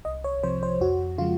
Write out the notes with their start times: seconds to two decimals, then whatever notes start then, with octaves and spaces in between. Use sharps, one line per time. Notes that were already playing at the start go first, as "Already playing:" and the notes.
0.05 C2 D#5
0.24 C#5
0.43 C3 F3 C5
0.63 C5
0.81 F2 F#4
1.18 C#3 F3 G#3 F4